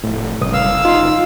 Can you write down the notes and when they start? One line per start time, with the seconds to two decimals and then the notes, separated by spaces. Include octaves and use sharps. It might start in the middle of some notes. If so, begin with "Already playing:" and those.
0.04 F1 A2
0.41 F#1 C2 D#6
0.53 F5 E6
0.85 D#4 F4